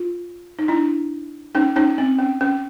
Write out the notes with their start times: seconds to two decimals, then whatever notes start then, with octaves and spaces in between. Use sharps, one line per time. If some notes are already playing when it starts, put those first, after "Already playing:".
Already playing: F4
0.59 D#4
0.68 D4 E4
1.55 C#4 D#4
1.76 C#4 D#4
1.98 C4
2.18 C#4
2.41 C#4